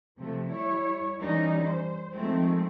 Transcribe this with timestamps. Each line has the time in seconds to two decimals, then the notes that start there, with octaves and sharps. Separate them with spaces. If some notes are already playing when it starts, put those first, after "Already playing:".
0.18 C3 F3 A3
0.48 G3 E4 C#5
1.19 D#3 E3 G3 C#4 D#4
1.63 C5
2.13 D#3 F3 G#3 A3 C4